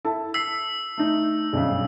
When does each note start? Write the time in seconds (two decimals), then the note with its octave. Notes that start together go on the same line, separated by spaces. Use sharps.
0.05 E4 A4 A5
0.34 E6 B6 C7
0.98 A3 D#4
1.53 B1 G2 C#3